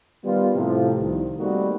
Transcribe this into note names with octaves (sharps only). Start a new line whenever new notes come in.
D#3 G3 B3 F4
A2 C3 F3
C2 D#3
G3 A3 A#3 C4 D#4 F#4